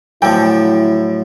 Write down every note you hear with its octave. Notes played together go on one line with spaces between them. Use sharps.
A2 D3 F3 F#3 E4 G5 A5